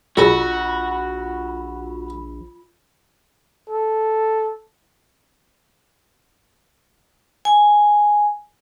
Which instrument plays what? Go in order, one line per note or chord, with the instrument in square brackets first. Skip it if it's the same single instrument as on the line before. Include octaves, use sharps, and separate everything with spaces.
[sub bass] A#1 [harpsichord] F#3 G#4 A4 [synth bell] F4 B5 [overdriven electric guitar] F#4
[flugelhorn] A4
[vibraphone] G#5